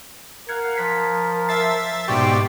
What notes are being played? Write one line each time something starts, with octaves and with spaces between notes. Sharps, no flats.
A#4 F5 F#5 G#6
F3 B6
E5 A6 C7
G#2 B2 G4 D5 G5 C6 C#6